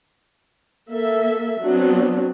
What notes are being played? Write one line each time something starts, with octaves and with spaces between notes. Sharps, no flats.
A#3 A4 E5
F#3 B3 C4 D4